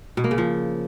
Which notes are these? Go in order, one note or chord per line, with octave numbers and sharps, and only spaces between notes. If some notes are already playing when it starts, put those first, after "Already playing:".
B2
A#3
C#3
F3